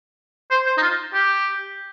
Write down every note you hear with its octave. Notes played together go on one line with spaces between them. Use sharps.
C5
C5
D#4
F4
G4